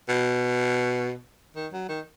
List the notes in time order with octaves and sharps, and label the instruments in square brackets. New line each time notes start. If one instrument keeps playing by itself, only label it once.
[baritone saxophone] B2
D#3
F#3
D#3